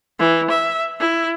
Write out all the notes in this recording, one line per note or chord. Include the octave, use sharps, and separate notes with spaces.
E3
E5
E4